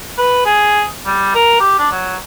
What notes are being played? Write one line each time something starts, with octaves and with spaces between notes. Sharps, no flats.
B4
G#4
G3
A#4
G4
D4
F#3